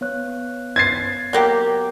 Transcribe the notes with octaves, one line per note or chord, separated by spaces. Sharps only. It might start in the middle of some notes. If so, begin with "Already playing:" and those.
B3 C#5 F#6
G#6 A6 C7
F#3 A#3 G4